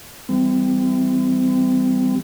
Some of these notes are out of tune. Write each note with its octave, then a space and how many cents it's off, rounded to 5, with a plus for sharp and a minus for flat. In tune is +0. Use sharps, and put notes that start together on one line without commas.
E3 +0 G3 +0 C4 -40